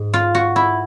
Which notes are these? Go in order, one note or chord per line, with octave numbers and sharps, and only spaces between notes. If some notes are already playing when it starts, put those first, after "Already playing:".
Already playing: G#2
F4
F#4
E4